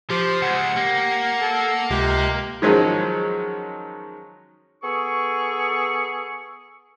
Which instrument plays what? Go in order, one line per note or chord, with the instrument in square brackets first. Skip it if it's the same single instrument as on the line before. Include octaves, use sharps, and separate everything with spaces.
[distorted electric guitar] F3 [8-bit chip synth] G4 [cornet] C5
[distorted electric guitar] C#3 G#3 [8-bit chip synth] F#5
[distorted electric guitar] A#3 [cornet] G4
[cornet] A4
[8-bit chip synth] C#2 C3 G#3 [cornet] G4
[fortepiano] D#3 F3 F#3 G#3 C#4
[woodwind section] B3 G#4 A4 C#6